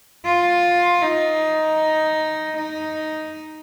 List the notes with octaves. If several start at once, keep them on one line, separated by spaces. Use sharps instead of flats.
F4
D#4
D#4